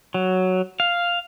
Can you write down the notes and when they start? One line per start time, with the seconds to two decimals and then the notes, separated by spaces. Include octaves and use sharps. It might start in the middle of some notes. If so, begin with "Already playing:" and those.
0.14 F#3
0.80 F5